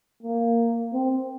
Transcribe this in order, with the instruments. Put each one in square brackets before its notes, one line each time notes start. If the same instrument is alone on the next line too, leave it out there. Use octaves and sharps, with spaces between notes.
[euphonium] A#3
C4